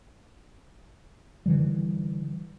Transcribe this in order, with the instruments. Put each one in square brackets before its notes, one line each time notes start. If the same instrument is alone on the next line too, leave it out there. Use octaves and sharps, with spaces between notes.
[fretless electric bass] D3 E3 G3